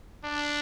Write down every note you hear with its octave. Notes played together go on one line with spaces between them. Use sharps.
D4